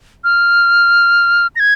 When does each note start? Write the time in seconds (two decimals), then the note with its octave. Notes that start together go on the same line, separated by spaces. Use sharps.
0.24 F6
1.56 A#6
1.60 G#6